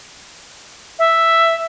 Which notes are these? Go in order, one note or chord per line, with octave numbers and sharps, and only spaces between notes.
E5